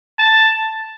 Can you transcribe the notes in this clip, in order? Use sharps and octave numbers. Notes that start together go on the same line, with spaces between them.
A5